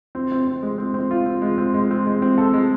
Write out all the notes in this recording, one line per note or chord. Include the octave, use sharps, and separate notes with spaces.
C4
C4
C4
G#3
C4
C4
F4
C4
G#3
C4
G#3
C4
G#3
C4
A4
G#3